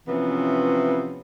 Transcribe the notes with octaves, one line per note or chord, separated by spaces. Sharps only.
C3 E3 F3 B3 C#4